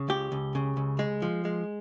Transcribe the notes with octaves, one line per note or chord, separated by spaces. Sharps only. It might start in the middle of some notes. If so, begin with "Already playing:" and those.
Already playing: C#3
C#2 G4
C#2
C#3
C#2
G#3
F3
G#3